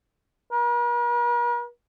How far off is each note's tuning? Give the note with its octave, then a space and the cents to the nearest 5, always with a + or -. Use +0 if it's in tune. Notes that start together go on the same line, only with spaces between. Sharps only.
A#4 +45